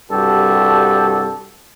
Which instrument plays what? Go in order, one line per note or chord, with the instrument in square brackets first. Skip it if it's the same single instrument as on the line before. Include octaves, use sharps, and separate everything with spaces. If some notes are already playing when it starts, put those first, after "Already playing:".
[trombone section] C2 G2 F#4 G4 A4